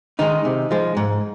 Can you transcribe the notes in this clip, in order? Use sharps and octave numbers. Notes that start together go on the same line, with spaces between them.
D#3 G#3 D#4
C3
F3 G#3
G#2